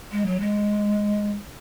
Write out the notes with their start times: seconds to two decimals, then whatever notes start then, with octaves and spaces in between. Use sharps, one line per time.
0.12 G#3
0.26 F#3
0.40 G#3